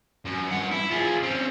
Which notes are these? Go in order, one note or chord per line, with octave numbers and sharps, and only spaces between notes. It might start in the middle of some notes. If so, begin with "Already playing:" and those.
F#2
G2 F#5
E4
F4 G#4
C4 C#4